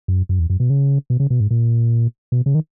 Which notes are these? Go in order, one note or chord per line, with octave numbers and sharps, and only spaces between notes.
F#2
F#2
E2
F#2
B2
C#3
B2
C#3
B2
G#2
A#2
B2
C#3
D#3